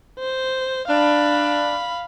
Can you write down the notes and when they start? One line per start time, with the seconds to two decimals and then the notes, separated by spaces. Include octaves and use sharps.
0.19 C5
0.88 D4 F5 B5